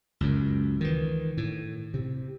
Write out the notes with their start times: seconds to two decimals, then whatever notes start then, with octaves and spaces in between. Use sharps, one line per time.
0.21 C#2 F#2
0.81 D#3 E3
1.37 A2
1.94 C3